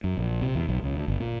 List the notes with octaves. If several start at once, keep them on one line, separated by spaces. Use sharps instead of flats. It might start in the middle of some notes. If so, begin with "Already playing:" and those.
F#2
A#1
C3
E2
B1
C#2
D2
G1
A#2